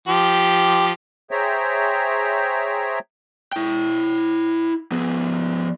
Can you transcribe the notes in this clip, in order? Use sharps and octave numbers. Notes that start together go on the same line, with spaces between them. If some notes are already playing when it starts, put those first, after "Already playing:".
F3 G4
G#4 C5 C#5 E5 G5 A#5
E4 G5
F3 B3